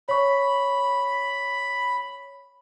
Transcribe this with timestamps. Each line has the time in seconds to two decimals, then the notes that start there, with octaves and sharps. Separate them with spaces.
0.09 C#5 B5 C#6